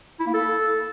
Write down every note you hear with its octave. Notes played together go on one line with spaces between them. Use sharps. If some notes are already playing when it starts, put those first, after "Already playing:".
E4
A#3
A4